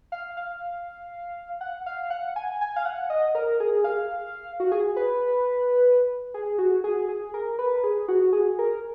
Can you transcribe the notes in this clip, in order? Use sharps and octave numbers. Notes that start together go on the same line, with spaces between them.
F5
F5
F#5
F5
F#5
G#5
G#5
F5
F#5
D#5
A#4
G#4
F5
F#4
G#4
B4
G#4
F#4
G#4
G#4
A#4
B4
G#4
F#4
G#4
A#4